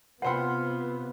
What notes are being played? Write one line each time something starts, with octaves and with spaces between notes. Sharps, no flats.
C3 B3 F4 B4 C5 F#5 G5 B5